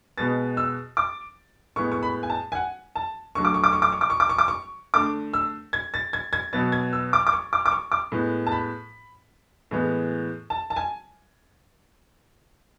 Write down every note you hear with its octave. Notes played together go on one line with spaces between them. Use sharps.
B2 G#3 B3 A6
E6
D6
A2 G#3 B3 C#6
C#6
B5
G#5
A5
G#5
F#5
A5
D3 F#3 A3 C#6
D6
C#6
D6
C#6
D6
C#6
D6
C#6
D6
C#6
D6
C#6
D3 A3 D6
E6
G#6
A6
G#6
G#6
B2 F#3 B3 A6
G#6
E6
D6
D6
C#6
D6
D6
C#6
D6
A2 G#3 B3
A5
B5
A2 E3 G#3 B3
A5
A5
G#5